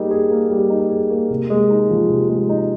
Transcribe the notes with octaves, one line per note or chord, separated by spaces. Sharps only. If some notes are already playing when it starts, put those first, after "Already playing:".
Already playing: G3 A#3 D#4 G#4
G#4
A#3
G3
D#4
G#4
A#3
C3
G#3
D#4
F3
C3
G#3
D#4